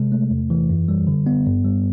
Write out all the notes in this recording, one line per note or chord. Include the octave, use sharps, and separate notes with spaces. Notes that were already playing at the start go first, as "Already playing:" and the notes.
Already playing: C3 G#3
A3
E2
E3
F#2
G3
D3
B3
G2
G3